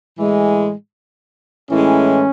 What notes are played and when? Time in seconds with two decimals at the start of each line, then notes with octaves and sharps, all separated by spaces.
0.19 A2 E3 G#3
1.71 A2 E3 G#3 C#4